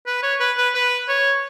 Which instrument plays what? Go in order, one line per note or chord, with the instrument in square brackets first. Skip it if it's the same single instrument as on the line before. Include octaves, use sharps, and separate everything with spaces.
[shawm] B4
C#5
B4
B4
B4
C#5